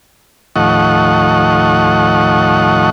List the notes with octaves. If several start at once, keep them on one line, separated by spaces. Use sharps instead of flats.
D#2 A2 F3 D#5 F#5 C#6